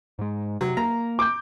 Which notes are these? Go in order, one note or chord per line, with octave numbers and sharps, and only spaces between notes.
G#2 G#3
C3 F#3
A#3 A#5
D6 G6